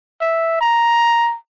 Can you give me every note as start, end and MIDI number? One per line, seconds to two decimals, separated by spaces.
0.21 0.57 76
0.61 1.36 82